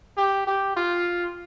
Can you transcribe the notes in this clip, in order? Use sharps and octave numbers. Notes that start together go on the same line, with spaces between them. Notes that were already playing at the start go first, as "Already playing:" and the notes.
G4
G4
F4